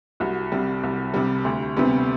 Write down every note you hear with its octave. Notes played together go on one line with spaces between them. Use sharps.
C2 F#4
C3 G3
C2
C3 G3
D2
C3 G3 B3